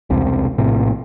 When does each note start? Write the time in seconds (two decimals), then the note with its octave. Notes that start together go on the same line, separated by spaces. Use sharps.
0.10 E1 C2 C3
0.58 A#1 A2 C3